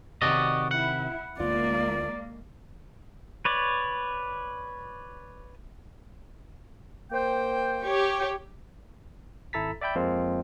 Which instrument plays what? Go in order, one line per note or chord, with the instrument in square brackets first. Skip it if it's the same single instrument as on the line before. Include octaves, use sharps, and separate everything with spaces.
[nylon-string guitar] C3 D#3 [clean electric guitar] F#4 D5 D#5
[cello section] E4 [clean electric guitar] F#5
[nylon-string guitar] D2 F4 [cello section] G#3 A#3 [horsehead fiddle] D5
[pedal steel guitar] B4 C#5 D5
[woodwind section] A#3 C5 G5
[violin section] G4 C#5
[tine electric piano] G#1 E4 A4 A#5 A6 B6
D5 E5 G5 B5 G6
F2 F3 G#3 A#3 C4 F4